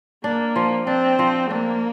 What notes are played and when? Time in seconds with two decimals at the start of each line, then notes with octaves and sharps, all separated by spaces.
0.24 A#3 D4
0.56 F3
0.87 C4 D4
1.19 F3
1.50 A#3 D4